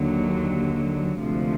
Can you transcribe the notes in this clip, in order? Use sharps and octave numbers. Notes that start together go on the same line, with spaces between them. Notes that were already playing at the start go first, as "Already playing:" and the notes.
Already playing: D#2 D3 F#3
D2 C3 F3 G#3